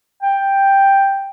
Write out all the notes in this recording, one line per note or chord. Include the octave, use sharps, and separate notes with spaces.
G5